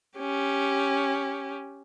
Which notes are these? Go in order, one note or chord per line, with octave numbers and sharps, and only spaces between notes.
C#4 G4